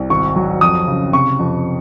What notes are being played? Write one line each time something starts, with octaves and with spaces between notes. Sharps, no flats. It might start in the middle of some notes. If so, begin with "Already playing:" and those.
Already playing: C2
G#1 C#6
F#3
F2 D#6
C#3
C3 C#6
F2